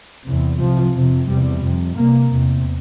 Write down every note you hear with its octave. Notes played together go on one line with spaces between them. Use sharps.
E2 C3
C2 C3 F3
F2 C3
E2 C3 G3
F2 C3
C2 C3 A#3
E2 C3